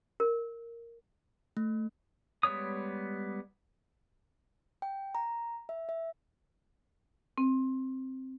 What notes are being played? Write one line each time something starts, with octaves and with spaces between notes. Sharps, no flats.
A#4
A3
G3 G#3 B3 C#5 D#6
G5
A#5
E5
E5
C4